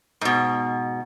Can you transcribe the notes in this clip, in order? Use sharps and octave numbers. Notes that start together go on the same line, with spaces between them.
G#2 B2